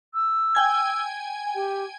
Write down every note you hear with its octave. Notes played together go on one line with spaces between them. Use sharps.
E6
G5 G#5 G#6
G4